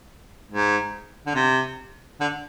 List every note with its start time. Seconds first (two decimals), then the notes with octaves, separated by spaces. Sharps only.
0.51 G#2
1.26 D3
1.35 C3
2.20 D3